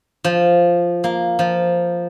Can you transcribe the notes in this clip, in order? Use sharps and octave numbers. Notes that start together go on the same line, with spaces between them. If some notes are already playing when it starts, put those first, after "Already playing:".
F3
A#3
F3